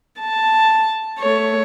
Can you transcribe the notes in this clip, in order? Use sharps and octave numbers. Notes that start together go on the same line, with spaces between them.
A5
A3 C#5